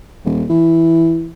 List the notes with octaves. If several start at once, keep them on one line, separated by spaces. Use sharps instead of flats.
D#1
E3